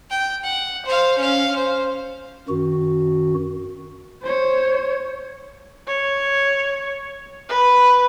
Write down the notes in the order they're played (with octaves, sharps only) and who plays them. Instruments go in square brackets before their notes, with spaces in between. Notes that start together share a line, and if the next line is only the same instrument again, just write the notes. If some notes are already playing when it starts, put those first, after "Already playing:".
[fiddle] G5
F#5
C5 F5
C#4 F5
C5
[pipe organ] F#2 D#3 F#4
[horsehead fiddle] C5 C#5
[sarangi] C#5
B4